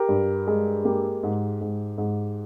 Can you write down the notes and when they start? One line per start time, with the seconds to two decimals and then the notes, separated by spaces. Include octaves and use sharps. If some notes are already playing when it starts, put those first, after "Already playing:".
Already playing: G4 A#4
0.09 G2
0.47 G#3
0.85 A#3 G4
1.23 G#2
1.61 G#2
1.98 G#2